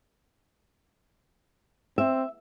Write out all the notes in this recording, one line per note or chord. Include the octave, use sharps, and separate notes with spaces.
C4 E5